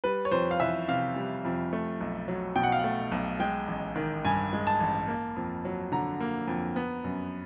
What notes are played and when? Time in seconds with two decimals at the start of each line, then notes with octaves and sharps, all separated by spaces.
0.04 G3 B4
0.25 C#5
0.32 F2 C5
0.51 F5
0.60 E3 E5
0.88 C3 F5
1.16 G3
1.45 F2
1.73 A3
2.01 B1
2.28 F#3
2.56 B2 G5
2.63 F#5
2.72 F5
2.79 A3 F#5
3.12 B1
3.40 G#3 G5
3.68 A1
3.96 D#3
4.25 G2 G#5
4.53 G#3
4.67 A5
4.80 A1
5.08 A#3
5.36 F2
5.65 F#3
5.92 D3 A#5
6.20 A#3
6.48 F2
6.76 B3
7.04 F#2